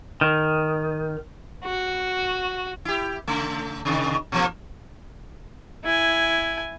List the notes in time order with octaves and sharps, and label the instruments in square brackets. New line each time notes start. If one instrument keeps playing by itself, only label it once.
[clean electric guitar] D#3
[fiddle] F#4
[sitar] E4 G4
C#3 A3
C3 D#3
B2 F3 A#3
[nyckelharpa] E4 G#5